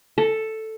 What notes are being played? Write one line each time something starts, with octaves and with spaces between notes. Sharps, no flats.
A4